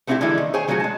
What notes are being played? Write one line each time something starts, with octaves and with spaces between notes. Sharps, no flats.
A3 B3 C4 D#4 E4 G4
D3 E3 F3 G#3 A#3 E4
D#3
G#4 C5 C#5 G5 G#5
D#3 F#3 A3 F4 F#4 G#4
G#3 A5